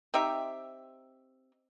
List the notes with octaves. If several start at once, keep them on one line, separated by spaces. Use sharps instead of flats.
C4 D#4 G4 E5